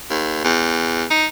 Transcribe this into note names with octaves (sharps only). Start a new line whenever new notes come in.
D#2
E2
D#4